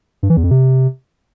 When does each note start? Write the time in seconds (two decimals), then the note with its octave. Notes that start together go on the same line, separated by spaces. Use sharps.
0.23 G2
0.30 E3
0.37 E2
0.44 F2
0.51 C3